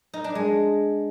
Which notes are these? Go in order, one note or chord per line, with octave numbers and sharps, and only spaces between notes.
D#4
D4
G#3